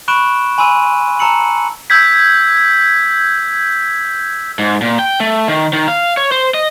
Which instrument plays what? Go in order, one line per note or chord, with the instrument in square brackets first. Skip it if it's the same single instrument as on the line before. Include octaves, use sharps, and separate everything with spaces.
[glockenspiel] B5 C#6 F#6 D7 E7 G7
G#5 B5 C6 E6 D#7
A5 A#5 E6 C#7 F#7
[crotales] E6 G6 G#6 B6
[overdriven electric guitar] G#2
A#2
G5
A3
D#3
D#3
F5
C#5
C5
D#5